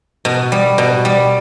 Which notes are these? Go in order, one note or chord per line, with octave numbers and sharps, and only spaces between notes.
B2
G3
B2
G3